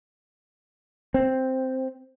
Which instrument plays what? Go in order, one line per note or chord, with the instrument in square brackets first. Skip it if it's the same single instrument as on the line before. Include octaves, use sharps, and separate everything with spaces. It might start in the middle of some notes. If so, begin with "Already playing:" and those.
[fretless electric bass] C4